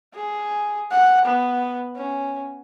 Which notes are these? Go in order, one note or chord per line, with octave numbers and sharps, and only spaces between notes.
G#4
F#5
B3
C#4